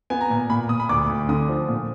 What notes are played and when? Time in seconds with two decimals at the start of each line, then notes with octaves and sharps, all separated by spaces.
0.10 B3 G#5
0.21 A#5
0.30 A#2 G#5
0.50 A#2 B5
0.69 A#2 D#6
0.80 B5
0.89 D2 D6
1.09 D2
1.29 D3 D#6
1.48 F3
1.68 A#2